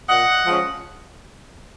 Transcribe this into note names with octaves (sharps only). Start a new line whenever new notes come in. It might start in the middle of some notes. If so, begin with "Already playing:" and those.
A#2 D#5 F#5
F3 G#3 C#4